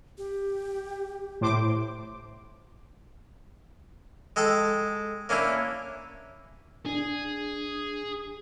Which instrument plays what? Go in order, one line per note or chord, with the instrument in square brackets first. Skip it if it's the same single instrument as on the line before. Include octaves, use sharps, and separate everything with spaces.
[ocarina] G4
[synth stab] A2 C5 D6
[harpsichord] G#3 A4 G5 A5
A#3 C#4 D4 E4
[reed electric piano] D4 [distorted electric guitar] G#4